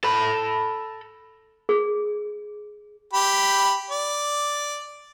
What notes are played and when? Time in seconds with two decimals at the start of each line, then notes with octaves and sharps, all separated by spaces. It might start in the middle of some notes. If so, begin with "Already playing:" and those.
0.04 A4 B5
1.69 G#4
3.13 G4 B5
3.91 D5